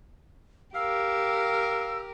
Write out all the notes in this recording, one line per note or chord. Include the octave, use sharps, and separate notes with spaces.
G4 A#4 F5 E6